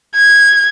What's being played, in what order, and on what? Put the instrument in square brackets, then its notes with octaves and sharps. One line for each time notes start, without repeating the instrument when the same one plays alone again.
[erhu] G#6